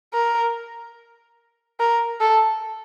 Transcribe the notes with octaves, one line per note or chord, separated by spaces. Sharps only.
A#4
A#4
A4